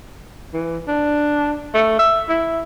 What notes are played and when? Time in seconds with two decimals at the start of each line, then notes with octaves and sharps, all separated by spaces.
0.53 E3
0.88 D4
1.74 A3
1.99 E5
2.29 E4